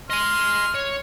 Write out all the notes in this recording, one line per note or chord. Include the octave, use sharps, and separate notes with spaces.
D#5 G#5 C6 F6
C#5